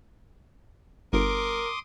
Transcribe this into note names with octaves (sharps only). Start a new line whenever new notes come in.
G1 A#4 C6 D6 D#6